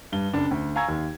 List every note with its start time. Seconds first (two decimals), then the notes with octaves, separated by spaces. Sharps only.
0.12 G2 G7
0.33 F#1 D4 A5
0.51 D2
0.76 F5 G#5 A#5 C#6 E6 G#6
0.88 D#2